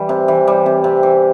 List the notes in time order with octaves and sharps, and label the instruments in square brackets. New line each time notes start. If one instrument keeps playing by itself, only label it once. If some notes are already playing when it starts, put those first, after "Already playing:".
Already playing: [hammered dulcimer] E3 G3
C3
E3
G3
C3
C3
E3